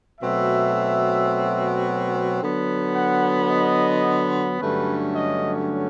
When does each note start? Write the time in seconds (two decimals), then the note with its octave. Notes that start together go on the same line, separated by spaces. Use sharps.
0.21 B2 F#3 A3 C4 E5
2.40 D3 F#3 B3
2.95 F#5
3.51 D#5
4.60 G2 D3 F#3 A3 C#4 B4
5.16 D#5